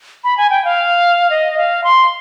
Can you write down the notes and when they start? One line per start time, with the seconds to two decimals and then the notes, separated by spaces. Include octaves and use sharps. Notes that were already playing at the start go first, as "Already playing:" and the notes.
0.24 B5
0.37 G#5
0.50 G5
0.65 F5
1.30 D#5
1.57 F5
1.84 C6